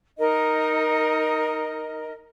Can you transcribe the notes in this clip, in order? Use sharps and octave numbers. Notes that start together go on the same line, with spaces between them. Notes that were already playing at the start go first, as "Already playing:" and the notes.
D#4 A#4 D#5